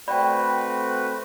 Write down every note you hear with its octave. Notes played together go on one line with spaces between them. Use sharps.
A3 C4 F#4 B4 D5 G5 B5